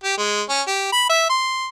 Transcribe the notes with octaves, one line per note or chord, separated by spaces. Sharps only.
G4
G#3
C#4
G4
B5
E5
C6